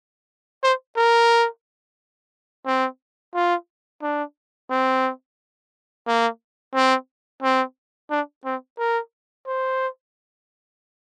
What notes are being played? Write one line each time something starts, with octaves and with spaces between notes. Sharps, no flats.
C5
A#4
C4
F4
D4
C4
A#3
C4
C4
D4
C4
A#4
C5